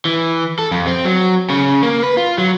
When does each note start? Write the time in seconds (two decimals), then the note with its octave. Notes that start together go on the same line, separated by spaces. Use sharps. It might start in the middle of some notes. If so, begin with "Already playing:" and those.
0.05 E3
0.59 A4
0.71 F2
0.87 C4
1.05 F#3
1.50 C#3
1.83 A#3
2.03 B4
2.17 F4
2.38 F#3